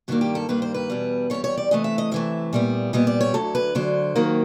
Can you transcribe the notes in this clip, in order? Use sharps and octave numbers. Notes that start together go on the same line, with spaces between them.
G2 D#3 G3 A#3 F#4
G4
A4
G2 D#3 G3 A#3 B4
C5
B4
E2 B2 G3
E2 B2 G3 C#5
C#5
D5
C3 E3 A3 D#5
E5
D#5
C3 E3 A3 E5
A#2 G3 B3
A#2 G3 B3 D#5
D5
C#5
D2 D3 F#3 A4
B4
D2 D3 F#3 C5
D#2 D#3 F#3 A#3